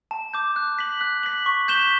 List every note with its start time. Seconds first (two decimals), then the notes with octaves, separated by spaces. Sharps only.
0.11 A5
0.34 D6 G6
0.56 F#6
0.79 B6 F#7
1.01 F#6
1.23 B6 F#7
1.46 C#6
1.68 G6 B6 E7 G7